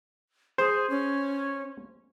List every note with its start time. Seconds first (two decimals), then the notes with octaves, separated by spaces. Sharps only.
0.58 G#4 C5
0.90 C#4